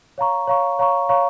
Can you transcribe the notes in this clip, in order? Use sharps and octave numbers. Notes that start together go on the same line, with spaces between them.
C#5 F5 A#5 C#6
C#5 F5 A#5 C#6
C#5 F5 A#5 C#6
C#5 F5 A#5 C#6